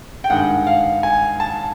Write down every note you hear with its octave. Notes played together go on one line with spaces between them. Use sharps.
G5
G2 D#3 G#3 F#5
F5
G#5
A5